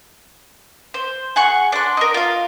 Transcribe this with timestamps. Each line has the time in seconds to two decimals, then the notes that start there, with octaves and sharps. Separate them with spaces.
0.94 C5
1.36 G#4 F#5 C#6
1.72 D4 C6
1.97 A#4 D#5
2.14 F4 F5